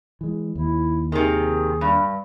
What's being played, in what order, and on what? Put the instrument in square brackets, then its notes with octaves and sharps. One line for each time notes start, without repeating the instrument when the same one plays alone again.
[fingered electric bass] E3 G#3
[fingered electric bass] D#2 [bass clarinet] E4
[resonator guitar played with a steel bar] C3 D#3 [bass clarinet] G#4
[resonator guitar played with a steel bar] G2 [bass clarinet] G3